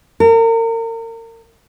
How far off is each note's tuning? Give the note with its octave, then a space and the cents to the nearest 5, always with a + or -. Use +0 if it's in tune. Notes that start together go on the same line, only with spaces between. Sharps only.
A#4 -35